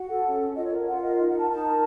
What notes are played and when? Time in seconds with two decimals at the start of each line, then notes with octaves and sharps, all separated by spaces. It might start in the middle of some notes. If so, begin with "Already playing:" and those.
Already playing: F#4 F#5
0.09 A4
0.25 C#4
0.40 A4
0.55 F4 D#5
0.66 C#5
0.71 A#4
0.86 F4 F#5
1.02 A#4 D#5
1.17 D#4 D#5
1.28 F#5
1.34 A#4 A5
1.49 D#4 A5
1.64 A#4